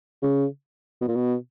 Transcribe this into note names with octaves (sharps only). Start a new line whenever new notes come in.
C#3
B2
A#2
B2